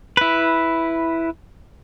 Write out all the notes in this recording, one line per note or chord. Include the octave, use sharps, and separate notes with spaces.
E4 B4